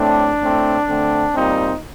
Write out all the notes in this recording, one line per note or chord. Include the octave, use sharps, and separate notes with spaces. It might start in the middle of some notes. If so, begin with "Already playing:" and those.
Already playing: A2 A3 C4 D4
A2 A3 C4
D3 A3 C4
A#2 G3 C4 D#4